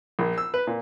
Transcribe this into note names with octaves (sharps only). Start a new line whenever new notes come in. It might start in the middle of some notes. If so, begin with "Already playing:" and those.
A#1
E6
B4
A#2